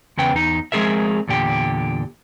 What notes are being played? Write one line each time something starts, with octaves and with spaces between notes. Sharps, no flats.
E2 C#3 B3 G5
E2 D#4
F3 G#3 C4 G#4 A#4 E5
E2 A#2 D3 G4